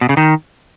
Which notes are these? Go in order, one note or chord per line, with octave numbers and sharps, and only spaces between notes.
B2
C#3
D#3